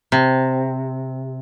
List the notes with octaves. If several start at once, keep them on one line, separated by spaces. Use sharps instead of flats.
C3